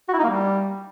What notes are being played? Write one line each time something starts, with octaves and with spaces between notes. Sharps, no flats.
F#4
E4
D#4
A#3
G3